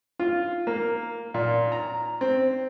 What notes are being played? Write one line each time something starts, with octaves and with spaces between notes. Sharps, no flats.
F4
A#3
A#2
A#5
C4